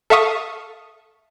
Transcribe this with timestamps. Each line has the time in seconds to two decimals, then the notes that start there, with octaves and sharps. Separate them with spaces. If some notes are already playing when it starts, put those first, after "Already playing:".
0.10 A4 E5 F5 C#6 D#6